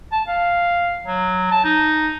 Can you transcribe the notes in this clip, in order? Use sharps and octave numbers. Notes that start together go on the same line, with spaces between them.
A5
F5
F#3
A5
D#4